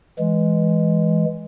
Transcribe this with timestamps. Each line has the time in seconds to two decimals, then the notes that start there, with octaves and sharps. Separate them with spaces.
0.18 E3 G#3